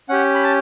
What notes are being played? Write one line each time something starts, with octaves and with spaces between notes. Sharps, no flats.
C#4 G4 F#5
B5
A5